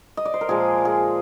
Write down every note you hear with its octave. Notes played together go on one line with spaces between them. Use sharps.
D#5
D5
C5
A#4
A#2 F3 G#3 G#4
G#4